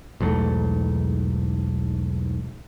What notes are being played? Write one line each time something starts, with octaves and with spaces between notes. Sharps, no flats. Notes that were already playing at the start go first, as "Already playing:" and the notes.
B1 E2 G#2 A3